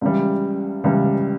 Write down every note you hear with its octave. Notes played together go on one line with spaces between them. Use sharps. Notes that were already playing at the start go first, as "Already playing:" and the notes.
C#2 C#3 E3 G3
C#2 C#3 E3 G3